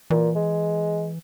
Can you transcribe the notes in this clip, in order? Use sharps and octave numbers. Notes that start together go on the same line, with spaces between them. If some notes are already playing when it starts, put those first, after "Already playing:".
A#2 E3
G#3